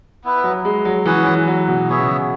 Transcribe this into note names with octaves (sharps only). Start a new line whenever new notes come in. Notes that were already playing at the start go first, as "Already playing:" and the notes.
B3 E4 B4
F#3
G#3
F#3
E3 C#4 G#4 B4 F#5
E3
F#3
B2
B2 B3 G#4 C#5 E5
C#3
B2